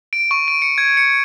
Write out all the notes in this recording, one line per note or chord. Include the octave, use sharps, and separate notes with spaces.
D7
C#6
D7
C#7
G#6
C#7